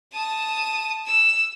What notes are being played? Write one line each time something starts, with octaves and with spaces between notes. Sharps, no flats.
A5 D#6
E6